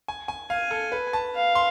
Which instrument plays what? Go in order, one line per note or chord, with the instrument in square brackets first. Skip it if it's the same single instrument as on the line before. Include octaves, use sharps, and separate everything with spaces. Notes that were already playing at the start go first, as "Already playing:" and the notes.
[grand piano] G#5
G#5
[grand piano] F5 [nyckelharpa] G#5
[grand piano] A4
B4
A5
[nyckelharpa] F5
[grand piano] C6